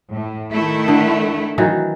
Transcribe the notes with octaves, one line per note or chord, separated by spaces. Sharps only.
A2
D#3 A3 E4
D3
D#3 E3 F#3